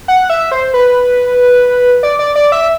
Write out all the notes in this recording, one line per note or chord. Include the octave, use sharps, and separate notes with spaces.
F#5
E5
C5
B4
D5
D5
D5
E5